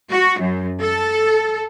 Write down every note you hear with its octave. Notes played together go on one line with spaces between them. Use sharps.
F#4
F#2
A4